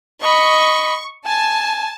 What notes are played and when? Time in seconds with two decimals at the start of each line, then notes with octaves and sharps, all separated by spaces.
0.23 D#5 B5 C#6
1.27 G#5 A5